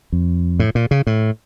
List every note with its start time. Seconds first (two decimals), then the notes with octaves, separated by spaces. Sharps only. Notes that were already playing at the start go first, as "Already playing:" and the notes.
0.12 F2
0.59 A2
0.75 A#2
0.91 C#3
1.07 A2